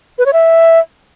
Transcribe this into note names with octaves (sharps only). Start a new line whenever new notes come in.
B4
C#5
E5